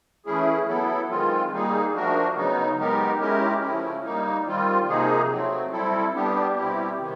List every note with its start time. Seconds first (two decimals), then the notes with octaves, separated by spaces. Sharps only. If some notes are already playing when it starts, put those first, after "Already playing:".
0.26 E3 A3 C#4 E4 G#4
0.67 F#3 B3 E4 A4
1.09 D#3 G#3 C4 F4
1.52 G3 A#3 D#4 G#4
1.93 F3 A3 D4 F#4 A#4
2.35 C#3 F#3 B3 D#4
2.78 G#3 B3 D#4 G4 A#4
3.19 G#3 C#4 E4 G4 A#4
3.62 C#3 F3 A3 C#4 E4
4.04 G3 A#3 D#4
4.46 D#3 G3 C4 F4
4.87 C3 F3 A#3 D#4 G#4
5.30 F#3 A3 C4
5.72 G3 C4 E4 A4
6.14 G3 B3 D4 G4
6.56 B2 G3 C4 E4 G4
6.98 C3 D#3